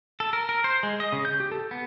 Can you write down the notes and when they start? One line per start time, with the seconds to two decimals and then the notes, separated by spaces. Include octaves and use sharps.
0.20 A4
0.33 A#4
0.49 A#4
0.64 C5
0.83 G#3
1.00 D#5
1.12 C#3
1.25 G6
1.40 G4
1.52 A4
1.71 B3